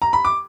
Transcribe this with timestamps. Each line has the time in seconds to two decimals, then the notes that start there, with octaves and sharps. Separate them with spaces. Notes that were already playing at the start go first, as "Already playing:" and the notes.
0.02 A#5
0.13 B5
0.25 D6